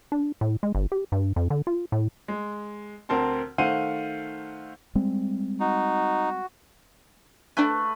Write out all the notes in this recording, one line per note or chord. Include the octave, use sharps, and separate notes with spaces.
D4
A2
G#3
G1
G4
G2
F2
D3
F4
A2
G#3
D2 C4 A#4 A5 C6
D#3 A3 C5 F5 F#5 D#7
G3 G#3 C4
D#4 F#4
A3 D4 B4 G5 G#5